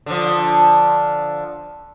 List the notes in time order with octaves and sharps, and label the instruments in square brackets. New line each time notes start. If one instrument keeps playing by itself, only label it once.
[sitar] D3 F3